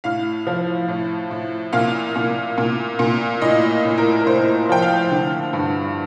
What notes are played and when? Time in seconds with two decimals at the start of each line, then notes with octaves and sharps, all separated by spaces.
0.04 A2 F5
0.47 F3
0.88 A2
1.31 A2
1.73 A#2 F5
2.16 A#2
2.58 A#2
2.99 A#2
3.41 A2 D#5
3.84 A2
3.98 A#4
4.20 A#4
4.26 A2 C5
4.69 F3 G5
4.82 F5
5.11 D3
5.53 G2